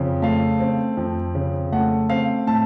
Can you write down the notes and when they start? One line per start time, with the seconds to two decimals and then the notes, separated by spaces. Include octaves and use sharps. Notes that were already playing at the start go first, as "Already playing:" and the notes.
Already playing: F2 C#3
0.22 A3 F5
0.60 C4
0.97 F2
1.35 C#3
1.72 A3 F#5
2.10 C4 F5
2.47 A2 A5